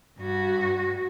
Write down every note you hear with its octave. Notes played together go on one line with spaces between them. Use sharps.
G2 F#4